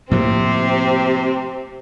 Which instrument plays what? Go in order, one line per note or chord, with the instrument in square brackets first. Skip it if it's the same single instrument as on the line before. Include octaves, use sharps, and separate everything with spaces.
[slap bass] A2 F3 A#3 [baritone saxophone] C3 [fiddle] C4